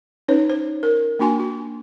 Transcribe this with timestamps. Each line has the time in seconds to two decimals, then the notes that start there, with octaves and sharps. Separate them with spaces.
0.28 C#4 D#4 B4 C#5
0.50 C5
0.83 A#4
1.19 A#3 D4 F#4 G#5 C6
1.40 F#4